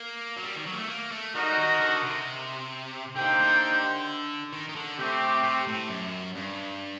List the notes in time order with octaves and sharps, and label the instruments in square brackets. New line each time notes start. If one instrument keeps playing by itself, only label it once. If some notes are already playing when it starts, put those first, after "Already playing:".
Already playing: [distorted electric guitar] A#3
F#3
G3
D#3
F#3
A#3
A3
A#3
A3
[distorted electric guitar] G3 [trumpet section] D#4 F#4 A#4 D#5 F#5
[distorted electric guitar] D#3
D3
C3
[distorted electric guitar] D3 [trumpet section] A#3 D#4 G4 C5 G5
[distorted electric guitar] D3
D#3
D#3
D3
[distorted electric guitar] C3 [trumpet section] A3 C4 G4
[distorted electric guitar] C3
A2
F#2
G2